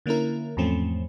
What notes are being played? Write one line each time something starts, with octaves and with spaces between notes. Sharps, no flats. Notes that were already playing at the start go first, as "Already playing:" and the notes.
D3 A#3 C#4 E4 A#4
E2 G#2 F3 A3 C4 C#4